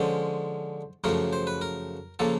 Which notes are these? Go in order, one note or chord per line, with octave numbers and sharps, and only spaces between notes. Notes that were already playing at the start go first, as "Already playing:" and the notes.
Already playing: D3 F3 G#3 C#4 C5
F#2 C#3 F3 A3 A#4
C5
B4
A#4
C#3 F3 A#3 A4